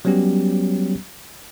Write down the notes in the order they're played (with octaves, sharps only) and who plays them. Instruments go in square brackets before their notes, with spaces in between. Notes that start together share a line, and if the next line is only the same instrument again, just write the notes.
[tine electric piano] F#3 G3 B3 C#4 G4